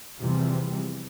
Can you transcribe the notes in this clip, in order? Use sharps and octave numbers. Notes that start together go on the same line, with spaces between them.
E2 C3 E3 F3 G3 C4